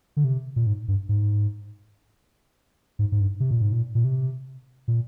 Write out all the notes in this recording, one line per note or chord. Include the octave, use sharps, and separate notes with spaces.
D3
C3
A#2
G#2
G2
G#2
G#2
G#2
G2
C3
A#2
G#2
A#2
A#2
C3
A#2